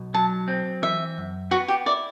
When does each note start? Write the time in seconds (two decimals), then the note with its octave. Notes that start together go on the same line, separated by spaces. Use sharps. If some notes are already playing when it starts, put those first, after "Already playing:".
Already playing: B1 B2
0.14 F#3 A5
0.48 C4
0.82 E3 E5
1.18 F#2
1.51 B3 F#4
1.68 G4
1.86 E4 D5